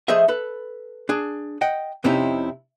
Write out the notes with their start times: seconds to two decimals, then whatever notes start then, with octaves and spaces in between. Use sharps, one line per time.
0.08 F3 A3 G#4 C5 D#5 E5
0.28 A4 B4
1.09 D4 G#4
1.61 D#5 F#5 G5
2.04 F2 C3 C4 C#4 D#4 E4